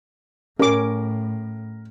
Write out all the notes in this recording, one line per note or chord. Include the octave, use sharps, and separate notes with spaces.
A2 C#4 A#4 D6